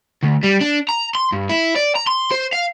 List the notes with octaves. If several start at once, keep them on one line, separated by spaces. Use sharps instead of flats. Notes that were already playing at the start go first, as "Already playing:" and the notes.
D2
G3
D4
A#5
C6
G2
E4
D5
A#5
C6
C5
F5